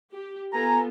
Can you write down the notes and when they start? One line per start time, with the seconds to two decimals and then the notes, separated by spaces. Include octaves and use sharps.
0.13 G4
0.54 B3 F4 A4 G#5 A#5